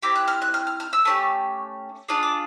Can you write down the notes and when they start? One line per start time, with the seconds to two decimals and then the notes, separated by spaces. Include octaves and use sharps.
0.02 C4 E4 G4 D6
0.16 F#6
0.28 F6
0.42 F#6
0.54 F6
0.67 F6
0.80 F6
0.93 E6
1.05 A3 C#4 E4 G4
2.08 D4 F4 G#4
2.23 D6